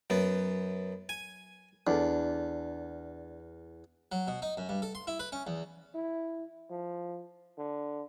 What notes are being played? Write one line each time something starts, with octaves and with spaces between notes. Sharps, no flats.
F#2 B3
G#5
E2 D4 A4
F#3
B2
D#4
F#2
G2
A4
C6
E4
B4
C#4
E2
E4
F3
D3